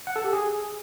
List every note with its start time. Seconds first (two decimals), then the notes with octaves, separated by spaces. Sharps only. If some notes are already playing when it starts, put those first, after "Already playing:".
0.07 F#5
0.16 A4
0.24 G4
0.33 G#4